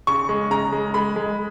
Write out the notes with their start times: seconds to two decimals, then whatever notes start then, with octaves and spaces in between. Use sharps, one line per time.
0.07 C#3 C#6
0.29 G#3
0.51 C#3 A#5
0.72 G#3
0.94 G#3 B5
1.16 G#3